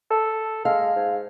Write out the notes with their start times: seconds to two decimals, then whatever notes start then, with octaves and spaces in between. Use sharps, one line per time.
0.11 A4
0.65 G#3 F5
0.96 G#2